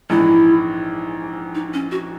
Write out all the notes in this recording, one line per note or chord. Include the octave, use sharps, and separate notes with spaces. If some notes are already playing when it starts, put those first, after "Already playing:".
A#1 G#2 E3 E4
D#4
C#4
F#4